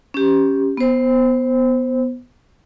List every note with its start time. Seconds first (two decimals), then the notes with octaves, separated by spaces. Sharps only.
0.14 C#4 G4
0.77 B3 C5